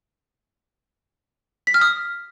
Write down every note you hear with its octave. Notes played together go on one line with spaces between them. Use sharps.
B6
F6
D#6